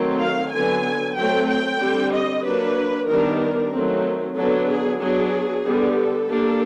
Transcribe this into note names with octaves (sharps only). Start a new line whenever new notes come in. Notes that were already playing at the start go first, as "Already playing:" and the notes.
Already playing: D#3 F#3 A3 C4
F5
D3 F#3 B3 G#5
F#3 A3 C4 G5
G5
D3 G3 C4
D#5
F#3 A#3 D4 B4
D#3 G3 B3 D4 A#4
A#4
D#3 F#3 A3 C4
D3 F#3 B3 D4 A4
G#4
F#3 B3 D4 G#4
D3 G3 B3
A4
G3 A#3 D4